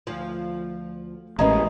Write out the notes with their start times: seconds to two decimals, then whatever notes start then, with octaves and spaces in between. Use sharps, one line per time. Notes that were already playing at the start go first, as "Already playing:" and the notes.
0.07 D2 F3
1.39 A1 A2 G#3 A#3 B3 C#4 D#5 A#5